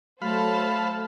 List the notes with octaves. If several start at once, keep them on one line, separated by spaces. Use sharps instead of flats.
F#3 A3 A4 C5 F5 A5 B5